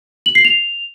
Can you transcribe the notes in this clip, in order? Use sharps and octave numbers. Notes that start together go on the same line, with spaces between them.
F#7
C7
F7